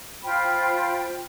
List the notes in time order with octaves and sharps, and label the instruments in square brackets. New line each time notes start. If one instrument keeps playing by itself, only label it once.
[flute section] F4 C5 G5 B5